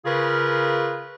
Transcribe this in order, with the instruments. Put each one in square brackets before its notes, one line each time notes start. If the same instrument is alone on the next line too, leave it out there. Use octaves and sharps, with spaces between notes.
[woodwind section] C#3 F4 G#4 A#4 B4